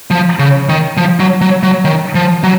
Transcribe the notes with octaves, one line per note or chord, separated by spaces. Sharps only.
F3
C#3
D#3
F3
F#3
F#3
F#3
D#3
F3
F#3